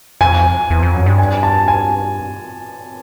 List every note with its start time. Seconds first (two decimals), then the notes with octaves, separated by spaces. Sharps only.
0.21 F2 G#5
0.70 E2
0.83 F2
0.94 F#2
1.06 G2
1.18 G#5
1.43 A5
1.68 G#5